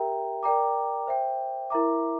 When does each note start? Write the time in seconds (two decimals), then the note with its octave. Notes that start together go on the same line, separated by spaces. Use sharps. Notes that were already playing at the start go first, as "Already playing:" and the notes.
Already playing: G4 A#4 E5 G5 A#5
0.43 A#4 D5 G5 A#5 D6
1.07 C5 E5 G5
1.70 E4 A#4 E5 A#5 D6